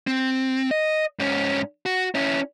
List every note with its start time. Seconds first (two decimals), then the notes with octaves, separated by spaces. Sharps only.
0.07 C4
0.71 D#5
1.19 G#2 C#4
1.86 F#4
2.15 C#4 E4